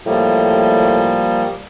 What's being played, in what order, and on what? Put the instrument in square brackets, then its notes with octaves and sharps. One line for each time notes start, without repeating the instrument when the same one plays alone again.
[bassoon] A2 [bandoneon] F3 G3 A#3